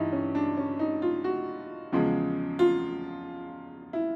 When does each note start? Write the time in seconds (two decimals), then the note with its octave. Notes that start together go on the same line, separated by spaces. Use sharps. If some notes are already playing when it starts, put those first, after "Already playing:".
Already playing: G2 E3 D#4 E4
0.12 C#4
0.35 D4
0.57 C#4
0.79 D#4
1.02 F4
1.24 F#4
1.92 E2 C#3 F3 G#3
2.59 F4
3.93 E4